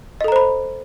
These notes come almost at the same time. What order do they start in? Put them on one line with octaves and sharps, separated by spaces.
D#5 A4 A#5 C5 B5